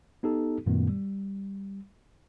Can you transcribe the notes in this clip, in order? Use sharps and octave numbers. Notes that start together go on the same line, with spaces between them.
B3 D#4 G4 A4
F#2 A#2 D#3 A3 B3
G3